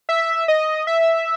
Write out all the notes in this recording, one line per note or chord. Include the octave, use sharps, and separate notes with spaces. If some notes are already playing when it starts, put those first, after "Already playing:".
E5
D#5
E5